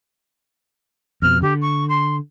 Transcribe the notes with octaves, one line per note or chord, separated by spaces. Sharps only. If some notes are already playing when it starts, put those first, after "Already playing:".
F2 B2 F6
D3 G4
C#6
C6